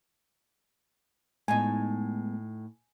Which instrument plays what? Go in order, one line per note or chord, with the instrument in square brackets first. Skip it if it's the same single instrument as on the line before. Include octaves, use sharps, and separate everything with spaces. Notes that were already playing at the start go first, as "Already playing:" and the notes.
[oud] A2 D#4 [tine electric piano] G#3 B3 [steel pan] G#5